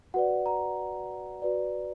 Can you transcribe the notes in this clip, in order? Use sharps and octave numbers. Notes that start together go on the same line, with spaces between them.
F#4 B4 D5 F#5
A#5
F#4 B4 D5